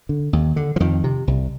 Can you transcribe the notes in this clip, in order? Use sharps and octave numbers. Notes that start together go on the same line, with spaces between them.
D3
D#2
D3
F3
F2 D#3
C3
C2